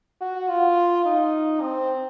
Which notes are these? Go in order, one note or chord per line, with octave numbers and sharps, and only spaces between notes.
F#4
F4
D#4
C4